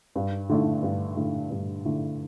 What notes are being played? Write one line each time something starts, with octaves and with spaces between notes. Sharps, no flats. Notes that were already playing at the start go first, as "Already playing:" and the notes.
G2
D3 A3 E4
G2
D3 A3 E4
G2
D3 A3 E4